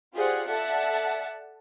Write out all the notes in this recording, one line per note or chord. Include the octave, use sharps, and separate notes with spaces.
F4 G4 G#4 C5 D5 F#5
A4 D5 E5 F#5 A5